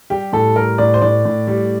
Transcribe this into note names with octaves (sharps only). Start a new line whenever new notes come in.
G3 G4
A2 A4
G3 A#4
A2 D5
C5
A2 D5
A2
G3